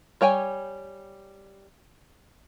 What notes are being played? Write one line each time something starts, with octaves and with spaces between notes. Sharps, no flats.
G3 C#5 G5 G#5